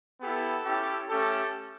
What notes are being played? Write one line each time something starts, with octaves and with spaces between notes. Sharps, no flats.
B3 E4 G4 A4
C#4 E4 G4
A3 C#4 G4 A4